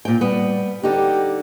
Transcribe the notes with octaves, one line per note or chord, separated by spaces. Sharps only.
A#2 G5
G3 B3
D3 D#4 G4